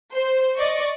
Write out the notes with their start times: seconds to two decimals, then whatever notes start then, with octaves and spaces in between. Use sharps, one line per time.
0.13 C5
0.57 D5 D#5 C#6